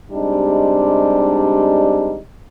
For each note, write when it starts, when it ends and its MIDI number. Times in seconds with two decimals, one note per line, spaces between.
0.12 2.17 48
0.12 2.17 55
0.12 2.17 56
0.12 2.17 62
0.12 2.17 63